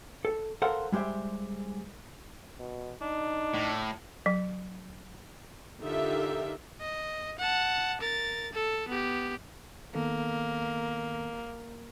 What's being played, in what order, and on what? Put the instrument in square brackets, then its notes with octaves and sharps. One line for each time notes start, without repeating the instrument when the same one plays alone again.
[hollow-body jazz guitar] A4
A4 A#4 C5 F5 F#5
G3 G#3 G4 C5 E5
[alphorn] B2
[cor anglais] D4 [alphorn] D#4
[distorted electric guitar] A2
[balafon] F#3
[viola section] D3 D#4 F4 G4 A#4 E5
[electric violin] D#5
F#5 A5
A#4 A6
A4
B3 G4
[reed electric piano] D#3 B3 A4 [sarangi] A#3